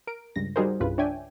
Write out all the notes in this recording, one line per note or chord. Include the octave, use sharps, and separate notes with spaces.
A#4 D7
C#2 G2 A#6
G3 D#4 F#4 G#4 A#4 C5
C2 G2 C#3 F4 B4
D4 C#5 D5 E5 G5 G#5